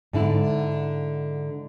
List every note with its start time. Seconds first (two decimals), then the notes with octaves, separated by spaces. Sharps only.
0.13 G#2 D3 E4